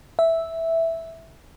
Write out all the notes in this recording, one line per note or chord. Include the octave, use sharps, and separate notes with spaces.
E5